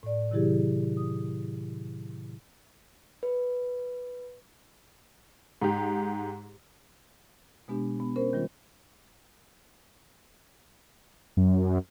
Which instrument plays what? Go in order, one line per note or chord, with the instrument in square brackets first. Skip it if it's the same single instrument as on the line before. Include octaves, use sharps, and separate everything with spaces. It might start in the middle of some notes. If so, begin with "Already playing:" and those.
[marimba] A2 D5
C3 D#3 F#3 E4 G4 G#4
D#6
[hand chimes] B4
[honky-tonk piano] G#2 G4
[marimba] B2 G#3 B3 D4 G4
B3
C#4 A#4 C5
D#3 G3 F4
[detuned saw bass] F#2